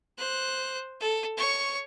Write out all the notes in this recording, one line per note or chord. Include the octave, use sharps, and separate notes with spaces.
C5 F#6
A4
C#5 C#6